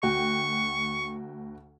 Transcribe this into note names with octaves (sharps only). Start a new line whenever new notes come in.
D2 F#4 G5 C#6